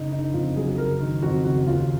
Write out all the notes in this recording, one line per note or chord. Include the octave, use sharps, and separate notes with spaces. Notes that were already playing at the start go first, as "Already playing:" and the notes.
Already playing: F#1 D#4
D3 D#4
F2 F4
F#3 G#4
F#1 A#4
D#3
F2 F#4
F#1 F#4
D#2 F4